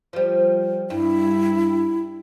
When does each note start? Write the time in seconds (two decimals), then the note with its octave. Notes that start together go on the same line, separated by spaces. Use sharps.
0.13 F3 G3
0.90 G2 E4